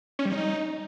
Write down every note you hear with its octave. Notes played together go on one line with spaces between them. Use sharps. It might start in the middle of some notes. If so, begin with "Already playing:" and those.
C#4
G3
D#4